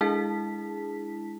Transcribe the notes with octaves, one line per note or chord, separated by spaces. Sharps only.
G#3 D4 E4 G#4 A5 B6